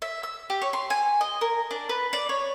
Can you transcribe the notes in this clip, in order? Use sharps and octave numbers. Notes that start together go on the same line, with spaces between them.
E5
E6
G4
C#5
C6
G#5
D#5
A#4
D4
B4
D5
C#5